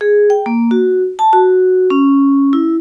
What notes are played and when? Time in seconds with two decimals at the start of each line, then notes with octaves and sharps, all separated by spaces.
0.01 G#4
0.30 G5
0.46 A#3
0.71 F#4
1.19 A5
1.33 F#4
1.90 C#4
2.53 E4